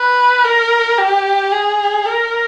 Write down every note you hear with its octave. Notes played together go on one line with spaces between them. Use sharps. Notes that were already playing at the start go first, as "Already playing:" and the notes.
Already playing: B4
A#4
G4
G#4
A#4